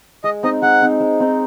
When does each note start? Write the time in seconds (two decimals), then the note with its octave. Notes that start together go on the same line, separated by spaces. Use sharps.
0.24 G#3 D#5
0.43 C4 D#4 D#5
0.62 G#3 F#5
0.82 C4 D#4
1.00 G#3
1.20 C4 D#4